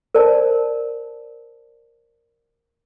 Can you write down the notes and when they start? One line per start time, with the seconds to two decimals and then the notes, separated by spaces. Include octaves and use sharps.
0.15 A#4 C5 D5 A5